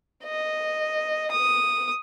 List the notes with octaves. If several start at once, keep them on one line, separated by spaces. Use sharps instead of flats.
D#5
D#6